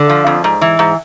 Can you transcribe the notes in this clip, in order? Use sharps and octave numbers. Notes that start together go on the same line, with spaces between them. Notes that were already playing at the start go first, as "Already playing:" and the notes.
Already playing: D3 D5
F3
F2
G#2
E3
G#2